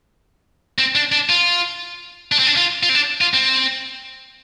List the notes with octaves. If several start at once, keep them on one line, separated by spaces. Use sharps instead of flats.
C4
D4
D4
F4
D4
C4
D4
F4
F4
C4
D4
F4
C4